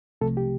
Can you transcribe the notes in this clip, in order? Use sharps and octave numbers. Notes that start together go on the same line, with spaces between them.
C2 C3 F3 A3 A4
G4